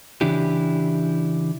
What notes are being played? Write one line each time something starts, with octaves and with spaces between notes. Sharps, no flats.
C#3 E3 D4 E4 G4